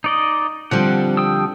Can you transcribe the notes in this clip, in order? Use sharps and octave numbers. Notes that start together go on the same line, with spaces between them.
D#4 D5 D#5
D3 F3 G3 C4 F#5
G5 D#6 E6